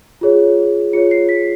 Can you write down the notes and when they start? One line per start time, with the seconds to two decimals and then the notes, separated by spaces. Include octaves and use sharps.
0.21 F4 G#4 C#5
0.93 F4 G#4 C#5 C#7
1.11 C7
1.29 B6